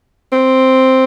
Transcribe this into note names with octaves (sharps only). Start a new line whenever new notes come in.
C4